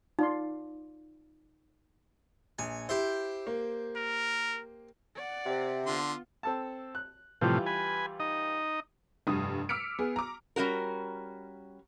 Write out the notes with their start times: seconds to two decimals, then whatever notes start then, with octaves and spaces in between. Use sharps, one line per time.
0.19 D#4 F4 D5 C6
2.59 A#1 G#5
2.89 E4 G4 C5
3.47 A#3
3.96 A#4
5.15 D5 F#5
5.46 C3
5.86 D3 B3 F4 C6
6.43 C4 A4 A5
6.95 F#6
7.41 A2 C3 E3 F3 G3 F4
7.66 B4 G#5
8.20 D#4 D#5
9.27 F1 G2 D#6
9.69 D6 E6 F6 B6 C#7 D7
9.99 B3 G#4
10.16 A#5 D6
10.56 G3 C#4 F#4 A#4